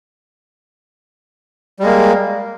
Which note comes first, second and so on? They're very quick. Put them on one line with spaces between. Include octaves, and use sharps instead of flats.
G3 G#3 A#3